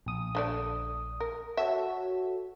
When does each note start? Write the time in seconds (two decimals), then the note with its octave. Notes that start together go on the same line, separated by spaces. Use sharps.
0.06 A#1 D#6
0.35 D3 A3 D5
1.20 A#4
1.57 F#4 A4 C#5 E5